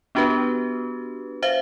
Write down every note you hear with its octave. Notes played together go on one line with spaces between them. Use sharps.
B3 D4 F#4 G4 B4
C5 E5 F5